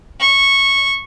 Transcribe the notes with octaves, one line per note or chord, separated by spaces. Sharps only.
C#6